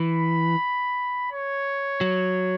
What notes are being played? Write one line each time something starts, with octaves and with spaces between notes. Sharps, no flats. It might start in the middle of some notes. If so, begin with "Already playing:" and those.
Already playing: E3 B5
C#5
F#3